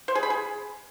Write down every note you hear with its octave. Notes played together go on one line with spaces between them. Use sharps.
C5
G#4
B5
G#4